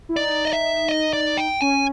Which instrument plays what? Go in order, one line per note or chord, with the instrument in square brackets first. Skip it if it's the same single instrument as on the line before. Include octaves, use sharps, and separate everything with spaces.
[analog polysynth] E4
[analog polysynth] D#4 [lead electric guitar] D5
[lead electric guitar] D#5
E5
D#5
D5
G5
[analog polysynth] C#4 [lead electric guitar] G#5